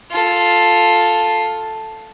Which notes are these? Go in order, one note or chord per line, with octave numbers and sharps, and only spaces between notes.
F4 A4